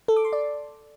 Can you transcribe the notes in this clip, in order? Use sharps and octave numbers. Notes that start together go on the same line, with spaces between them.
A4
D6
C6
D5